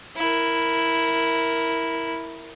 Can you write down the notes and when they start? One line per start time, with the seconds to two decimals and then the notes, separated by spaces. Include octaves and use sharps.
0.16 E4 A#4